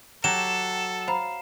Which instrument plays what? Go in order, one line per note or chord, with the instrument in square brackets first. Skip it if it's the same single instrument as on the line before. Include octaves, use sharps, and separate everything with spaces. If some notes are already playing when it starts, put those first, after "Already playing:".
[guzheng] F#3 G4 [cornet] A4 [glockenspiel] E7
[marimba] C5 A#5 B5 [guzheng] F5